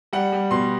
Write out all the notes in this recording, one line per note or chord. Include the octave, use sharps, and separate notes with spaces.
G3 F#5
G3
B2 C6